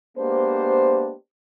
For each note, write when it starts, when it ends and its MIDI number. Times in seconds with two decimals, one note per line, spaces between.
0.18 1.13 56
0.18 1.13 58
0.18 1.13 59
0.18 1.13 62
0.18 1.13 67
0.18 1.13 72